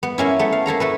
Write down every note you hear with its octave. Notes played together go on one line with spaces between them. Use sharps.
B3
A#3 C#4 E4
A3 B3
F5
A#3 E4 A4 A#5
A3 A4 B4